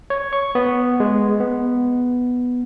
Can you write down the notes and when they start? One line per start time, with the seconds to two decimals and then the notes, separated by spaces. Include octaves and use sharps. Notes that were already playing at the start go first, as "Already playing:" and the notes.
0.10 C#5
0.33 C#6
0.55 B3
1.00 G#3
1.40 B3